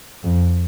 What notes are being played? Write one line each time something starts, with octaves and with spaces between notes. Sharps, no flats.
F2